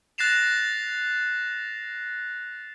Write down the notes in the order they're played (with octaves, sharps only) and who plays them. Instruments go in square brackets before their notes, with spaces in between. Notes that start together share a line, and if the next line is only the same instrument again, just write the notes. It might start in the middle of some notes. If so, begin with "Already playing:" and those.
[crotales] F#6 A6 A#6 C7 E7 F7